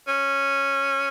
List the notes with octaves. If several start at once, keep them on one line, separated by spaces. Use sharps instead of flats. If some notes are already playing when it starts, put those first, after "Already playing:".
C#4